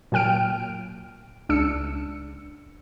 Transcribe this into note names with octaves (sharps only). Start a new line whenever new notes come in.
A#2 F#3 G5 F6 D7
C#2 D4 E6 C#7